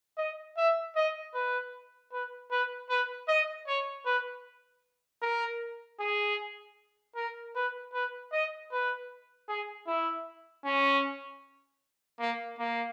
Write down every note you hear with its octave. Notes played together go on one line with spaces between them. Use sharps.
D#5
E5
D#5
B4
B4
B4
B4
D#5
C#5
B4
A#4
G#4
A#4
B4
B4
D#5
B4
G#4
E4
C#4
A#3
A#3